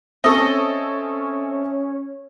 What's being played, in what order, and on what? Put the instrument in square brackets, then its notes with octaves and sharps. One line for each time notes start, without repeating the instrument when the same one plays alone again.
[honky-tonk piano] C4 A4 [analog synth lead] C#4 [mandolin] D#5 [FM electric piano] E5 C#6